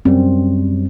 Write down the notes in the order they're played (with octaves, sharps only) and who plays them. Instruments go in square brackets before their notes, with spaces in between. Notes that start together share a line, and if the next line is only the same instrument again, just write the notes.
[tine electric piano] F#2 G3 [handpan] C4